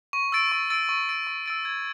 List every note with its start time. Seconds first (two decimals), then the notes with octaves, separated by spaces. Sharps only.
0.13 C#6
0.32 E6 A6 D7
0.52 C#6
0.70 E6 A6 D7
0.89 C#6
1.09 E6 A6 D7
1.27 C#6
1.46 E6 A6 D7
1.65 G#6